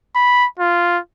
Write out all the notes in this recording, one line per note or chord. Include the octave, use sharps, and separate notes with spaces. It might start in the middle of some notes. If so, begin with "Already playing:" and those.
B5
F4